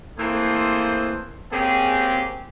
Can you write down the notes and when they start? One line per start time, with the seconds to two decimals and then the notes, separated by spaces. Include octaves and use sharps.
0.19 E3 A3 A#3 C4 G#4 C5
1.52 G#3 A#3 C4 C#4 G4 G#4